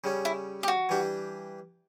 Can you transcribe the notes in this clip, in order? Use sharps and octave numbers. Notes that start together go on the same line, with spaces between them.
C#3 G3 C#4
E4
G4
F#4
E3 G3 D4 G4